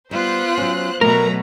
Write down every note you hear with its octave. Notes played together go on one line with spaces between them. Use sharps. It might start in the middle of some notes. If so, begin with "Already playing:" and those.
G3 B3 F4 C5 F#6
F#3 C#4
B2 F#3 A3 A#4 B4 A#5